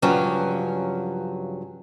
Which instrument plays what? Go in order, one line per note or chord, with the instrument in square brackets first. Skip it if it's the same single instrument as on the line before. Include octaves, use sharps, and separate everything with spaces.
[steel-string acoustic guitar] G2 C#3 F3 F#3 C#4